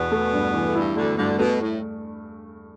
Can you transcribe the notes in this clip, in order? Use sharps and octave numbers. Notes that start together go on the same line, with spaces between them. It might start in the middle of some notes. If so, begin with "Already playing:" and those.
Already playing: E2 B2 B3
A3
G2
E3
A3
G2 G3 E4
D2 D3 A3
D2 G2 D3
B2 A3
A2